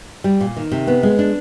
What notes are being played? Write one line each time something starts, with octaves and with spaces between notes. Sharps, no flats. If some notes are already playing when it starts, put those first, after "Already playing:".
G3
A#2
D#3
C3
B3
G#3
D4